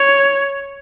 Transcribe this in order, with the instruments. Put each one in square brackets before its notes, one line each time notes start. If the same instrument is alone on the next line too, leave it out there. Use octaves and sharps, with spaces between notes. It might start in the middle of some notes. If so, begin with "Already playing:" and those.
Already playing: [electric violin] C#5